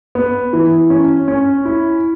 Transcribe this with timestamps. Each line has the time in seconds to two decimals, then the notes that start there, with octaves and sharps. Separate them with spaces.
0.15 B3
0.53 E3
0.90 C#4
1.28 C#4
1.65 E4